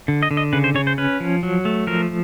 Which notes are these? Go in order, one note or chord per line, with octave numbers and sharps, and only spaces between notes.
D3
D#5
D3
D#5
C#3 B4
C5
C#3 C#5
C5
C#4 B4
F3
F#3
A3
F3 A#4